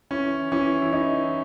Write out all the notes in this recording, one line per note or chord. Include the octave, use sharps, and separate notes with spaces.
E3 C#4
E3 C#4
E4
E3 D#4